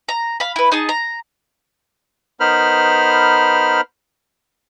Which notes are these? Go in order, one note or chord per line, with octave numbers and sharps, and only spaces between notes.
A#5
F5 B5
E4 B4
D#4 G#4 A5
A#5
B3 D#4 A#4 C5 B5 F6